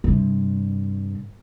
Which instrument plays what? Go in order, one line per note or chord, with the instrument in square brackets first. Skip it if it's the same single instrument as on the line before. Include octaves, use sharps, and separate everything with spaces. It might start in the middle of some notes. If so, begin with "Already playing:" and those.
[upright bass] G2 C3